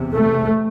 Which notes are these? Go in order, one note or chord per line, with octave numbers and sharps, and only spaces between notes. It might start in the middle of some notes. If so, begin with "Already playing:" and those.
Already playing: E2 C3
A3